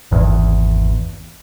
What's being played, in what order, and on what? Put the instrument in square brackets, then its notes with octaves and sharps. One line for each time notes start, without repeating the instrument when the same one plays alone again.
[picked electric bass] G#1 E2